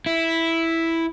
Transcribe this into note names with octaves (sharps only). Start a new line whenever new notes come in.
E4